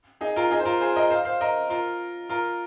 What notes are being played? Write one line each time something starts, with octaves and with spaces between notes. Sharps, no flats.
D#4 G#4
F4 A#4
D#4 G#4
C5
F4 A#4
G#4 C5
A#4 D#5
C5 F5
C5 F5
A#4 D#5
F4 A#4
F4 A#4